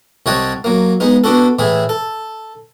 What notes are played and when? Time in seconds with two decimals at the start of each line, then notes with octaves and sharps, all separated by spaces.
0.26 C2 G3 C#5 D#5 F#5 A5
0.64 F#3 A#3
1.00 G#3 B3 D#4
1.24 B3 D4 F#4 A4
1.59 A2 E3 E4 G#4
1.89 A4